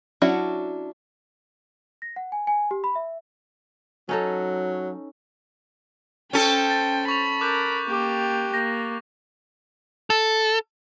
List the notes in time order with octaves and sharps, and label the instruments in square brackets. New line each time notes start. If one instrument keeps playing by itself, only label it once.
[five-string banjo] F#3 C#4 D4 E4 F#4
[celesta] A#6
F#5
G#5
G#5
G4
B5
E5
[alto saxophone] F#3 [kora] C#4 D#4 A4
[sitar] C#4 A4 [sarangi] C5 [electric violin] G5
[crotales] A6
[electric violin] B5 [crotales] C#6 A6 F7
[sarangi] A#4 [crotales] D6 F#6 G6
[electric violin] A#3 [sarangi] G4
[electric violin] A#3 [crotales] A#6
[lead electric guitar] A4